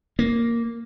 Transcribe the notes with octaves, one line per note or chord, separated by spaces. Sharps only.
A#3